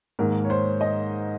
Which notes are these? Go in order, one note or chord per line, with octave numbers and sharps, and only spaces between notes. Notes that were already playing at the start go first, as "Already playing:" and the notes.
G#2 D#3 A#3 A#4
C#5
C5
D#5